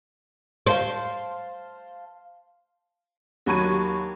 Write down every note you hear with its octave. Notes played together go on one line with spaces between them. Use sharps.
C5 F5 A5 C6
D#2 F#3 B5 C#6 G#6 D#7